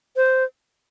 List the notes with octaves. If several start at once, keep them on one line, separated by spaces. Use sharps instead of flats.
C5